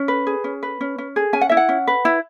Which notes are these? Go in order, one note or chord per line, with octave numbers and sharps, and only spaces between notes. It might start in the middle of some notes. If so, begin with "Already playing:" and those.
Already playing: C#4
B4
G#4
C#4
B4
C#4
C#4
G#4
C#4 G#5
F#5
E4 E5
F#5
C#4
B4
E4